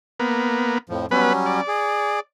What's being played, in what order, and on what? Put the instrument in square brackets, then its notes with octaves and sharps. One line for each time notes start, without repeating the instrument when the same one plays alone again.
[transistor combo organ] A#3 B3
[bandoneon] F2 A2 F3
[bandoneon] F#3 G3 C#4 [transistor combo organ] B3 B4
[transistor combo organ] D5
[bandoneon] G#4